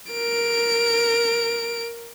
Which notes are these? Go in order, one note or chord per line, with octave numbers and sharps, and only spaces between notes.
A#4 D7